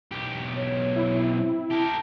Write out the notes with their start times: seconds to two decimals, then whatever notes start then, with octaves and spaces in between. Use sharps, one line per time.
0.11 B1 G4
0.55 C#5
0.96 E4
1.29 C4
1.70 G4 A#4 A5